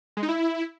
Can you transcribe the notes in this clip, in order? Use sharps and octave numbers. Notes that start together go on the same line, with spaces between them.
G#3
D#4
E4